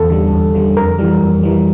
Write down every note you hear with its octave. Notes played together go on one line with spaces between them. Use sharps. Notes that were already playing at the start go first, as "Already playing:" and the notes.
Already playing: E2 A4
D3 G3
E2
D3 G3
F2 A#4
E3 G3
F2
E3 G3